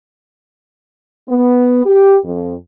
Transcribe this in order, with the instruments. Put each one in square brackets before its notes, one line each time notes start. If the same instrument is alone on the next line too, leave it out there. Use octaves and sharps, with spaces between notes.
[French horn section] B3
G4
F2